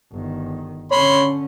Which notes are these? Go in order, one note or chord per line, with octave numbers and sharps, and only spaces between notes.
G1 D#3
D3 C#4 C#5 B5 C6